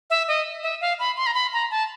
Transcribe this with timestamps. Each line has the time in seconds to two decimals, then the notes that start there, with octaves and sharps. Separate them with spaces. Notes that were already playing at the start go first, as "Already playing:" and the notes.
0.10 E5
0.28 D#5
0.63 E5
0.81 F5
0.99 B5
1.17 C6
1.26 A#5
1.34 B5
1.53 A#5
1.71 A5